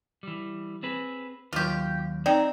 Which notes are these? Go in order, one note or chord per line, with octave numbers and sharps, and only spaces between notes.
E3 G3
C4 G#4 B4
D#2 F#3 F4 G4
C4 D#4 D5 G5